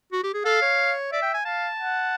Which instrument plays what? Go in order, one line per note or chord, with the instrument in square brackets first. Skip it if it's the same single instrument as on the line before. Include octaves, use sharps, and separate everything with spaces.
[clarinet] F#4
G4
G#4
[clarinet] A4 [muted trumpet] F5
[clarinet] C#5
[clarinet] D5 [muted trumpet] E5
[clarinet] G5
G#5
[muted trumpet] F5 [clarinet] A5
[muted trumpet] F#5